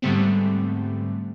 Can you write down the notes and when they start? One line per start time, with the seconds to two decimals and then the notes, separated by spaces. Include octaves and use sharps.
0.02 G#2 D3 G3 A3 B3 C4